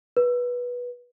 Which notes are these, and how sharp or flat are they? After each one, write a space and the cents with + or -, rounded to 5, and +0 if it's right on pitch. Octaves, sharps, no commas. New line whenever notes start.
B4 -15